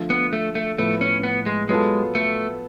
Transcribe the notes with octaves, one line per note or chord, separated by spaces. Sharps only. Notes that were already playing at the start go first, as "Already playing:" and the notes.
Already playing: D3 F3 A3 F4
B3
A3
A3
A2 F3 A3 B3
C#4
B3
G#3
F#3 G#3 B3 F4 A4
A3